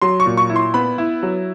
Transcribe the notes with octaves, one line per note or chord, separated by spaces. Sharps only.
F#3 C6
C#6
A#2
C#6
E4
C6
B3 B5
E4
F#3